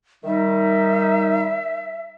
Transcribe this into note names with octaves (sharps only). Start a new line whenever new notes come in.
D#3 G3 D#4 E5